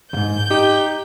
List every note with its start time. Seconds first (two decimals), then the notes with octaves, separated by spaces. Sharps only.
0.13 D#2 G#2 G6
0.50 D#4 G4